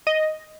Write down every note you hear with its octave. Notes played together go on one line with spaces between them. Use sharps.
D#5